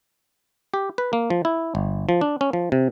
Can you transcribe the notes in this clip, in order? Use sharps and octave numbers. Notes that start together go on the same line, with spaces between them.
G4
B4
A#3
F3
E4
G1
F3
D4
C#4
F3
C3